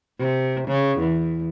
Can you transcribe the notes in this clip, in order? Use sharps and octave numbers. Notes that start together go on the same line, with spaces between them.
C3
C#3
E2